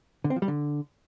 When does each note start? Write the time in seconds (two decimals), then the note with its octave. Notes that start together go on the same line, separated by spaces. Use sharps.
0.24 D3
0.30 C4
0.36 F3
0.42 G3
0.48 D3